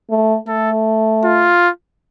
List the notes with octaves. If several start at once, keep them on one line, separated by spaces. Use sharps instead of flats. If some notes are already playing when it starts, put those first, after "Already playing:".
A3
A3 A4
F4